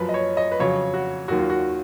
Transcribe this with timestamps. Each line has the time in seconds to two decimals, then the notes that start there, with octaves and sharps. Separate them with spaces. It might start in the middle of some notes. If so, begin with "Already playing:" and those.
Already playing: F#2 F3 B4
0.09 D#5
0.14 C#5
0.37 D#5
0.52 B4
0.59 F2 C#3 F#3 C#5
0.94 F#4
1.28 D#2 D#3 F#3 F#4
1.39 F4
1.50 F#4